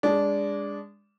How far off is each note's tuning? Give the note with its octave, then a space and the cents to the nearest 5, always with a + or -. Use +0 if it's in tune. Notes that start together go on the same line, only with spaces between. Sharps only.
G#3 -25 D4 -15